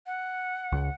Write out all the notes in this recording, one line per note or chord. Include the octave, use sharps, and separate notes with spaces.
F#5
C#2